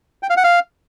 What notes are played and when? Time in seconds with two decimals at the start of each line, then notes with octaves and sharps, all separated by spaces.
0.23 G5
0.30 F5
0.37 F#5
0.44 F5